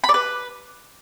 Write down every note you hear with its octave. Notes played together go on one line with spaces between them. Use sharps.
B5
D5
B4